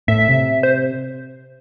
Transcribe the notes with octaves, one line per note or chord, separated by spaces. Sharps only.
A2 E5
C3
C5